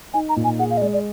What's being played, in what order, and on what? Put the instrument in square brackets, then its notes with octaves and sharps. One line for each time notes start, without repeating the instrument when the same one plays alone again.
[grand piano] D#4 [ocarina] G#5
[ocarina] A#5
[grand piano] A#2
[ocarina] G#5
[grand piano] G#4 [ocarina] F#5
[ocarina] F5
D#5
[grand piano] G#3 [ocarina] D5
[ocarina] D5